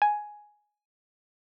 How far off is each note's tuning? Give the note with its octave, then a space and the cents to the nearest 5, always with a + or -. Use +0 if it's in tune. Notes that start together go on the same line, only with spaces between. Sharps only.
G#5 +5